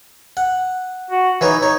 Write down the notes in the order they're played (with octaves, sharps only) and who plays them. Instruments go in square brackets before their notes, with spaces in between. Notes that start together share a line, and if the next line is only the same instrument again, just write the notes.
[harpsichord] F#5
[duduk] F#4
[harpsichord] E3 B4 C#5 [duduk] D#4
[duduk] D#4 [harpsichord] C#5